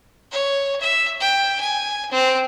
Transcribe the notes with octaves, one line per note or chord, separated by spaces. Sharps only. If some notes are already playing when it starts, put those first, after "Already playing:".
C#5
E5
G5
G#5
C4